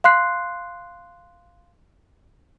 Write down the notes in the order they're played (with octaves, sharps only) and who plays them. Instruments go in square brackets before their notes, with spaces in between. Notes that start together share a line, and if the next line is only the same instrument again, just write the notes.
[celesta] F5 C6 F#6 C7